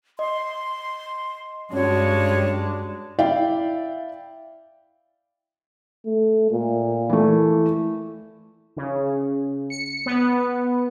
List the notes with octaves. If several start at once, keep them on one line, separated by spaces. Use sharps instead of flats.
D#5 C6
G2 G#3 C#4 D4 F#4 C#5
E4 D5 F5 G5
A3
A#2
E3 A3
C#3
C#7
B3